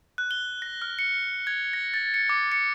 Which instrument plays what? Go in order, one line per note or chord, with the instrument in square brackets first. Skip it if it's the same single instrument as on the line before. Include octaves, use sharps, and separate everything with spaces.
[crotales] F#6
G7
A#6
F6
C#7
G#6
A#6
A6
C#7
D6
C#7